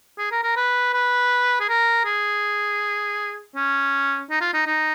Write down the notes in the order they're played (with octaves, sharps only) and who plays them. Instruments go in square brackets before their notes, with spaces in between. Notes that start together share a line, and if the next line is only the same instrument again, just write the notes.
[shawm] G#4
A#4
A#4
B4
B4
G#4
A#4
G#4
C#4
D#4
F4
D#4
D#4